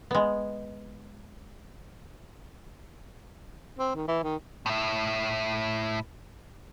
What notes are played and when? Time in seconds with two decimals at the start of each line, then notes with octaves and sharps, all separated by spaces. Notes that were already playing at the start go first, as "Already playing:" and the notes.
0.11 G#3 B3
3.79 C4
3.96 D#3
4.08 E3
4.23 D#3
4.66 A2 E4